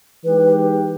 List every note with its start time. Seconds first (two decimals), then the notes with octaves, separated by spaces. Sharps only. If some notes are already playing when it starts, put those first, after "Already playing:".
0.24 E3 G#3 D#4 G4 B4